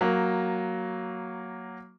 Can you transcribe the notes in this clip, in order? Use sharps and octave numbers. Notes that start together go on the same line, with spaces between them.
F#3 A#3